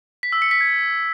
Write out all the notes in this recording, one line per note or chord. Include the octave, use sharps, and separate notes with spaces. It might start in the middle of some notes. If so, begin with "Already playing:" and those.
B6
E6
C#7
B6
G#6